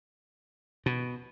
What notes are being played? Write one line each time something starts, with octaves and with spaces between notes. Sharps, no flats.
B2